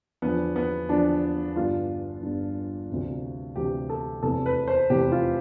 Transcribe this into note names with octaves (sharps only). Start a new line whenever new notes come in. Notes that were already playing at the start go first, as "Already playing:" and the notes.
E2 D3 F3 B3
B3
E2 D3 F3 D4
G1 G2 D3 F4
G1 G2 D3
D2 C3 E3
D2 C3 E3 G4
A4
F1 E2 C3 E3 A4
B4
C5
F1 E2 C3 E3 G4
F4